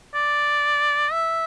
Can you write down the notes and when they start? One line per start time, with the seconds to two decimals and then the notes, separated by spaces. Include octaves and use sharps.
0.14 D5
1.12 E5